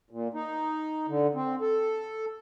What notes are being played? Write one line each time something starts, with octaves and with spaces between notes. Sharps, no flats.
A#2
D#4
D3
C4
A4